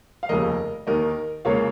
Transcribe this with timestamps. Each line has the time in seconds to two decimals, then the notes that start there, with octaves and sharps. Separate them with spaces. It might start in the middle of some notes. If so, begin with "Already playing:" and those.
0.23 F5
0.29 F1 D#2 C#3 A#4 D#5
0.87 D#2 D#3 A#3 A#4 D#5
1.45 C#2 C#3 A#3 C#5 F5